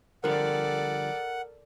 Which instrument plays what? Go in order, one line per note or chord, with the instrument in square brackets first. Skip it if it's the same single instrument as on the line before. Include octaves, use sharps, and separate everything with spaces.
[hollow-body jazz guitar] D3 F3 G3 [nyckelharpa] A4 D5 [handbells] A#4 [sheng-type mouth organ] F#5